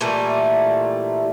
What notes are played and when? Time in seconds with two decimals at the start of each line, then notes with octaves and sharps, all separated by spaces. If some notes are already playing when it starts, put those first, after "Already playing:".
0.01 A#2 E3 G3 A3